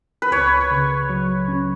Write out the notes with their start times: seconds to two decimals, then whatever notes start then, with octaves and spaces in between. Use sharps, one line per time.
0.22 B4
0.31 C#2 C#5
0.71 C#3
1.10 F#3
1.48 C#4